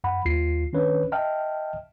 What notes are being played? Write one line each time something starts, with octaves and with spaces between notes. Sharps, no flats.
F#2 F#5 B5
D#2 F4 C7
D#3 C#4 D4 B4 C#5
D#5 E5 G5 A5 F6